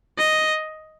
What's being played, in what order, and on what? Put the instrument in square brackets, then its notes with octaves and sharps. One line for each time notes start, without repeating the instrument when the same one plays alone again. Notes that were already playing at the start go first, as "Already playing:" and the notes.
[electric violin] D#5